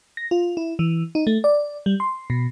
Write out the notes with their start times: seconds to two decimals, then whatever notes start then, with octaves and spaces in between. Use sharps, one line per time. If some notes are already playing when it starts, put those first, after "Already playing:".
0.17 A#6
0.31 F4
0.57 E4
0.79 E3
1.15 D#4
1.27 A3
1.44 D5
1.86 G3
2.00 C6
2.30 B2